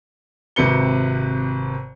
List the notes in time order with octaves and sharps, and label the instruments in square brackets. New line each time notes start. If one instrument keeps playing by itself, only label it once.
[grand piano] G#1 C3 B4 C#7 G7